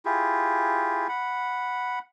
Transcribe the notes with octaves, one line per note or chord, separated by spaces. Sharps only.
E4 F4 G4 G#4
F#5 B5